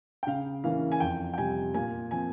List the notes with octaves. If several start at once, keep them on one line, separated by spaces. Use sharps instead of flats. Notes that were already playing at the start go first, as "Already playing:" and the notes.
G5
C#3 F5
E3 A#3 C#4 F5
G#5
F2 G5
G5
C3 G3 G#5
A#2 G#5
F3 C4 G#5